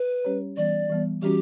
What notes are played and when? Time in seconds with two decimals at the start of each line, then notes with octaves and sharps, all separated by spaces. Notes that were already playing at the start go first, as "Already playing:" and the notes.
Already playing: B4
0.25 G3 C#4 G4 C#5
0.57 E3 G3 B3 D5
0.90 E3 G3 B3
1.22 E3 G3 C#4 F#4 G4